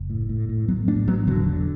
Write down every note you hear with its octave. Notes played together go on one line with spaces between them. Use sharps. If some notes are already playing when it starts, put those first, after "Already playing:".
Already playing: F#1
A2
A2
A2
A1 F#3 B3
A2 A3 D4
A1 F#3 B3
E1 D3 F#3
D3